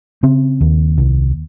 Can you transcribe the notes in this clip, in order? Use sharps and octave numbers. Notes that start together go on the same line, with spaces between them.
C#3 C4
D#2
C2